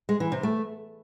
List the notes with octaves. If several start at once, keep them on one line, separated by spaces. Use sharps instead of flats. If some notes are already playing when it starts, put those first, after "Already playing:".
G#3
E3
C3
A3